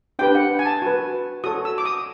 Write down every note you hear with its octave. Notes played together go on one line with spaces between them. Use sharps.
D4 G4 B4 G5
F#5
G#5
A5
F#4 B4
F#4 A4 C#5 D#6
E6
D6
D#6